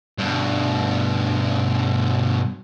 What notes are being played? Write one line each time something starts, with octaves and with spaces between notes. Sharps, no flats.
G2 B2